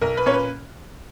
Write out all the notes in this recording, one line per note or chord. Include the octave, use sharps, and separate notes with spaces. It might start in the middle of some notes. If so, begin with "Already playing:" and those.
B1 A#4
B4
A#2 A#3 C#4 C#5
B4